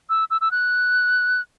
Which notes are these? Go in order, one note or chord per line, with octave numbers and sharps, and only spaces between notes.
E6
E6
E6
F#6